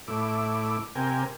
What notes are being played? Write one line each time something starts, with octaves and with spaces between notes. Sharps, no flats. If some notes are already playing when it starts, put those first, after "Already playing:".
A2 E4 D6
C3 G4 A#4 G#5